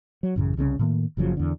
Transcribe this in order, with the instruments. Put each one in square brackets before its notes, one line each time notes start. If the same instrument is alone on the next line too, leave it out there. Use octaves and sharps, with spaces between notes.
[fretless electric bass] F#3
A1 F#2 C#3
C2 C#3 G#3 C#4
A2 D#3 A#3
F#1 C#3 F3 F#3
E2 D3